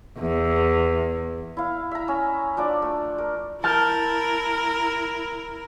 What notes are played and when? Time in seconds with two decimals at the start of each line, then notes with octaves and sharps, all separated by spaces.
0.19 E2
1.57 E4 F5
1.91 E5 A#5
2.08 C#4
2.57 F3 D4 D6
2.82 A3
3.18 A#4
3.64 E4 A#4 A5 F6 G6